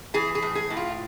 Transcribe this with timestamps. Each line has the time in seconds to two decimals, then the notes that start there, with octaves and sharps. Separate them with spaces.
0.14 E3 G#4
0.35 G#4
0.42 A2
0.55 G#4
0.70 A2
0.77 F4